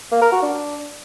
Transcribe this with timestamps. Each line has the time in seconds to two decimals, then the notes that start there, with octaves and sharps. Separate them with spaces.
0.12 A#3
0.22 A#4
0.32 F#4
0.43 D4